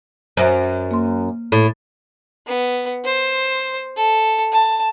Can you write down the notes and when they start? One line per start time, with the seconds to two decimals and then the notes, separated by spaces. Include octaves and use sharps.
0.37 F#2 C5 E5
0.91 A#3 C6
1.52 A2
2.47 B3
3.04 C5
3.96 A4
4.52 A5